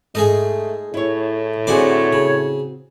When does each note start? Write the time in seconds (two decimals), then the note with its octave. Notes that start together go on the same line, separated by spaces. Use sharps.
0.15 G#2 A3 G#4 A4 D#5
0.94 A2 E4 C#5
1.67 D3 C4 F#4 G#4 C5 C#5 D6
2.13 C#3